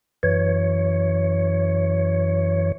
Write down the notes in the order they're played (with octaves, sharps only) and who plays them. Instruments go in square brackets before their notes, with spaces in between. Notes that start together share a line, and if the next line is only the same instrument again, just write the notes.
[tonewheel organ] F#2 E3 C#5